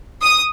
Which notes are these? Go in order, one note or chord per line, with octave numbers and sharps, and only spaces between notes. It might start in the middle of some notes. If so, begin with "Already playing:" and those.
D#6